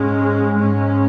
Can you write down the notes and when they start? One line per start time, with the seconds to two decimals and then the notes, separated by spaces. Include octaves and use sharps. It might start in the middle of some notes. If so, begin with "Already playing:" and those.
Already playing: G#2 G#3 C#4
0.58 G#2 G#3 C#4